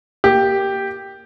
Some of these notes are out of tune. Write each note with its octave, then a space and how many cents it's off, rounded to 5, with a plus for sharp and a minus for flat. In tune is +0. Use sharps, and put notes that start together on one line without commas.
A#3 +0 G4 +0